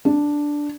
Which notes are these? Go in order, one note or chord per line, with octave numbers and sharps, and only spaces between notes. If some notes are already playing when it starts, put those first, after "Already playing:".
D4